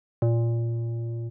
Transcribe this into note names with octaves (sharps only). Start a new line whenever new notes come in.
A#2